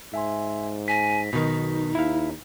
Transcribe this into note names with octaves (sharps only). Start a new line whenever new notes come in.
G#2 E5 G#5 C6
G#5 A#6 B6
B1 B2 D#3 D#4
D#2 E4 F5